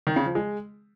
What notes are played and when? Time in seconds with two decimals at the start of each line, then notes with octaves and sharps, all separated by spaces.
0.07 D#3
0.16 C#3
0.26 F3
0.35 G#3